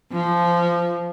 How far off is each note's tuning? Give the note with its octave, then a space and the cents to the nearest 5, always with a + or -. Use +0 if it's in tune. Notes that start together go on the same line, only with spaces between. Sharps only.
F3 -15